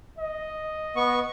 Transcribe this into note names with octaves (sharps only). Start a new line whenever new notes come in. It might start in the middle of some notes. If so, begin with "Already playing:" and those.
D#5
B3 C#6